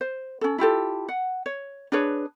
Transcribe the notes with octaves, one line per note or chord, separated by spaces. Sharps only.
C5
C#4 A4
E4 F4 G4 A4
F#5
C#5
D4 G#4 B4 C#5